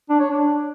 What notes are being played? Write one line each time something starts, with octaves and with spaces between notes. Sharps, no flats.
D4
C#5
D4